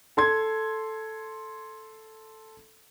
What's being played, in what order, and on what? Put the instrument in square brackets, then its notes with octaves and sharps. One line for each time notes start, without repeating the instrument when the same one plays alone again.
[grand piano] A4 C6 G#6